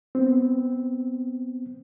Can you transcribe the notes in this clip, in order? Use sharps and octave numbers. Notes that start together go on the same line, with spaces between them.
B3 C4